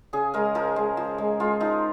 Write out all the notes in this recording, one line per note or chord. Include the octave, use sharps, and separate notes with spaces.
C#3 G#4
G#3 A#4
F3 A#4
G#3
F3
G#3
G#3 F4
F3 D#4